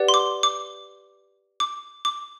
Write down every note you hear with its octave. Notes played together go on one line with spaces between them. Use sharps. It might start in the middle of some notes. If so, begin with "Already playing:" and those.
Already playing: G4 B4 D5 F#5
C6
D6
D6
D6
D6